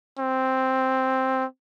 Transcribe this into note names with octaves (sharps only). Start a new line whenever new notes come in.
C4